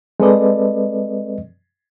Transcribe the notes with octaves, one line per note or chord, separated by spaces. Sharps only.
G#3 C4 A4 B4 D5 D#5